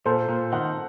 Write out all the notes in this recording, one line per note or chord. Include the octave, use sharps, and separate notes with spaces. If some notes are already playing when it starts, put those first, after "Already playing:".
A#2 A4 C5
A#2
D#3 F#5